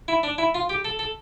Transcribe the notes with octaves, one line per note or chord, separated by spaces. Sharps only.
E4
D4
E4
F4
G4
A4
A4